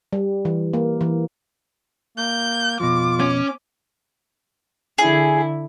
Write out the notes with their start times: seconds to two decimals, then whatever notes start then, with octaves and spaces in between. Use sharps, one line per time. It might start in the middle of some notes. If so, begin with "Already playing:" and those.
0.13 G3
0.45 E3
0.73 A#3
1.01 E3
2.17 A#3 G6
2.80 F2 B2 F4 D6
3.21 C#4
4.98 D3 E4 G#4